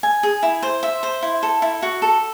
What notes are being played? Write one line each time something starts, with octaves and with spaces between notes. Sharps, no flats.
G#5
G#4
E4
C5
E5
C5
E4
A4
E4
F#4
A4